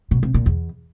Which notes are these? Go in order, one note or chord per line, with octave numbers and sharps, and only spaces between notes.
B2
C3
A#2
E2